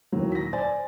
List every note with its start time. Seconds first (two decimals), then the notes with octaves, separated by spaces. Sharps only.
0.12 D#2 A#2 E3 F#3
0.32 A#6 B6
0.53 C5 D5 G#5 A6